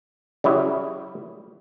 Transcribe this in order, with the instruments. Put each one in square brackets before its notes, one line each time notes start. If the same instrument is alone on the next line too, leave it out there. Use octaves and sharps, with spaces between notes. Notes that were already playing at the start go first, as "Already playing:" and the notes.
[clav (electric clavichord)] C#3 F#3 G3 E4